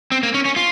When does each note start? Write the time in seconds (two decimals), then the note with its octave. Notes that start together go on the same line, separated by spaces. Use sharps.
0.12 C4
0.23 A#3
0.34 C#4
0.45 C#4
0.56 F4